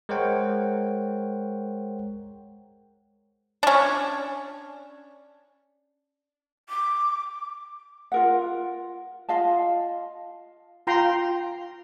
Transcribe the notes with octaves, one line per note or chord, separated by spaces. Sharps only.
G#3 A#4 C5 C#5 F#5 G5
C#4 D4
D6
F4 A#4 F#5
F4 D#5 F5 A5
F4 G5 A#5 C6